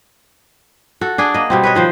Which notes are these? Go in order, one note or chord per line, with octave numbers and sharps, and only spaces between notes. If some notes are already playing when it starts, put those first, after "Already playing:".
F#4 A4
D4 G#4 D5
A#3 D#5
B2 G3 C4
B4 C#5 D#5
D#3 F3 C5